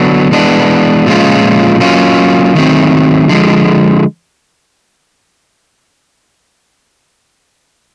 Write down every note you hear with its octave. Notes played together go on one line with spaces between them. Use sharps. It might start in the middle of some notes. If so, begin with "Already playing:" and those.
Already playing: D3 F#3 B3 D4
E3 G#3 B3 D4
A#2 F3 G#3 C#4 F4
F#3 A#3 C#4 F4
D#3 F#3 A3 C4
D3 F3 G#3